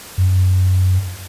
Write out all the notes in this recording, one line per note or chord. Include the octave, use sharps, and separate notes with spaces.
F#2